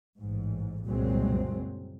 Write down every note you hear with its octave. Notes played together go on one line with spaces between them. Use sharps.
A1 G#2
F#1 C2 A#2 F#3 G#3 C4